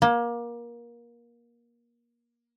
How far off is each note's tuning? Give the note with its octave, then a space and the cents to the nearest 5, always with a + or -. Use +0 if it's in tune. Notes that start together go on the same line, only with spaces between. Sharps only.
A#3 +25